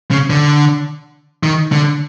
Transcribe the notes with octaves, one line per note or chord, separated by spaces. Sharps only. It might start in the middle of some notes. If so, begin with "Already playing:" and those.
C#3
D3
D#3
D3